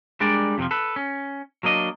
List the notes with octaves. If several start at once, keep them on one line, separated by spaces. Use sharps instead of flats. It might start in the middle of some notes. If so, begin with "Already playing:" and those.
G3 G#3 D4 A#4 D5
F2 C3 E3 F3
A4 B4
C#4
F#3 A#3 D4 D#5